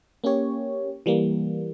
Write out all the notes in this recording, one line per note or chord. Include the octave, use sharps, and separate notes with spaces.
A#3 C#4 G4 C#5
E3 G3 A#3